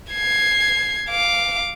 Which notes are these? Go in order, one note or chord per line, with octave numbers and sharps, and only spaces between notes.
G#6 C7
F5 D6